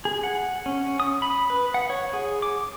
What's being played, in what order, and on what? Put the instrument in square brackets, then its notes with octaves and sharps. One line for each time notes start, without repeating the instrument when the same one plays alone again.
[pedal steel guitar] G#4
F#5
C#4
D#6
B5
B4
F#5
C#5
G#4
D6